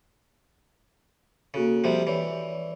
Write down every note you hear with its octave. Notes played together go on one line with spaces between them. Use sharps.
C#3 A#3 F#4 A4
C3 F3 G3
E3 C#5 D5